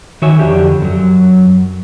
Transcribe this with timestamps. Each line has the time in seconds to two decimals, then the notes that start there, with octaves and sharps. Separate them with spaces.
0.22 D#3 F#4 C#5 E5 G#5
0.39 F2 D3 D4 G4
0.82 F#2 F#3